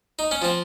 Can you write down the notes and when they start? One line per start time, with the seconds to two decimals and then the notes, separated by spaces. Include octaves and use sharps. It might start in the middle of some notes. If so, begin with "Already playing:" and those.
0.19 D#4
0.31 C#4
0.42 F3 C4